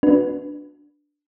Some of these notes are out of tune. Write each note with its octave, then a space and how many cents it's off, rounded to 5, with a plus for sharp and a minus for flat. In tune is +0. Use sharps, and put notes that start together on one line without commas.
D4 +0 F#4 -35 B4 +0